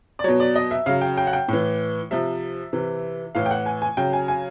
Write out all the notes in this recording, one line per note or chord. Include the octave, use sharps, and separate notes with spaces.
D5
B2 F#3 C#5
D5
D#5
E5
C#3 F#3 F5
G5
G5
F#5
G5
A2 E3
C3 F3 E5
C3 E3
A2 E3 F5
G5
F#5
G#5
G#5
C#3 F#3 G5
G#5
G#5